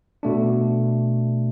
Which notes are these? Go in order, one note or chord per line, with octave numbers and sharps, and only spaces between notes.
B2 A3 D4